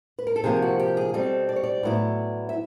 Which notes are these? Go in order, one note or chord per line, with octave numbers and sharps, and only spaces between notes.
B4
A#4
A4
C3 F3 A#3 G#4
F#4
G4
G#4
B2 G3 C4 A4
D5
C#5
D5
A2 F#3 B3 E4
E5